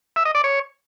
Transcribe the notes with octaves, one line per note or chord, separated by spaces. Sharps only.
E5
D#5
D5
C#5